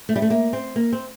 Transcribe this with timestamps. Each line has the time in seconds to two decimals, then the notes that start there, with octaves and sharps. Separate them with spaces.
0.09 A3
0.16 G3
0.22 A3
0.30 A#3
0.53 C4
0.76 A#3
0.93 C4